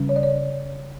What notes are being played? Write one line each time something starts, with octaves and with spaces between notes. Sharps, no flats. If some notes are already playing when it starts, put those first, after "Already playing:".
Already playing: C#3 G3 C#4
C#5
D5
C#5